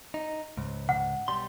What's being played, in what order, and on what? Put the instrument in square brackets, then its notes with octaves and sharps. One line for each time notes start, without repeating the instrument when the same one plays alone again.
[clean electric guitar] D#4
C#2 G#2
[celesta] F#5
[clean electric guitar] B1 G3 C6